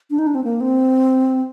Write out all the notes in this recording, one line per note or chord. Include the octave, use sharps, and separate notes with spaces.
D4
D#4
D4
C4
A#3
C4